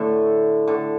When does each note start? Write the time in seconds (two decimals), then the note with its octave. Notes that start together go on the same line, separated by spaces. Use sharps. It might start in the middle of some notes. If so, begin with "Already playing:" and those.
Already playing: A2 D3 A3
0.68 D3